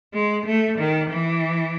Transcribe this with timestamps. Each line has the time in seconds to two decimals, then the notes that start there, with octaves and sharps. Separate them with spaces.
0.14 G#3
0.46 A3
0.79 D#3
1.10 E3